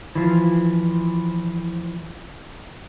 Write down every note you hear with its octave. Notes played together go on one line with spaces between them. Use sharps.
E3 F3